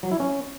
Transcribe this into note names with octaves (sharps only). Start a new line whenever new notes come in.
F#3
E4
C#4